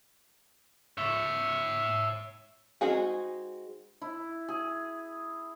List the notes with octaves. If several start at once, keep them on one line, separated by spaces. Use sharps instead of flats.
C#5 E5
G#3 C4 D#4 F#4 G#4
E4
G#4